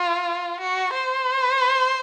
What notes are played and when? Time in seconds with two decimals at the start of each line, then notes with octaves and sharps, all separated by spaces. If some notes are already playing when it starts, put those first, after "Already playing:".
Already playing: F4
0.60 F#4
0.93 C5